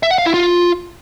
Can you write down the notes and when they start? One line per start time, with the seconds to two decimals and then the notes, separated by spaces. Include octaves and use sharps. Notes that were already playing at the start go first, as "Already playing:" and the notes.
0.03 E5
0.11 F#5
0.18 F5
0.26 E4
0.34 F4